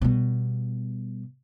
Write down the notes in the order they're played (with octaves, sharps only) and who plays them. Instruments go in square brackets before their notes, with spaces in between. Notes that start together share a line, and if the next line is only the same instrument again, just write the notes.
[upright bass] B2 G3